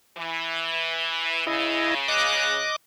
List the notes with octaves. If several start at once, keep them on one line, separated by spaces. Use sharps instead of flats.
E3
C#3 E4 D#5
D#5 D6 F#6